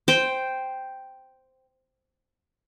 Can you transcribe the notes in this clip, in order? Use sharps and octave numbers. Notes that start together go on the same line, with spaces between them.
C5 G5